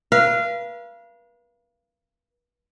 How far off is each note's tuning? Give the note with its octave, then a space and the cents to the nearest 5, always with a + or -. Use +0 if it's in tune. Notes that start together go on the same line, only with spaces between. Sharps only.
B4 -40 F5 -25